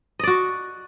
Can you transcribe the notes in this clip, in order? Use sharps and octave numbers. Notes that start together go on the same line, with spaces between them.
F#4 D5 D#5